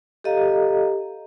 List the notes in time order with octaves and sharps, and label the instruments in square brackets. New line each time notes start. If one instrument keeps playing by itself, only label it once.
[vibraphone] G4 A4 D#5 F5 A#5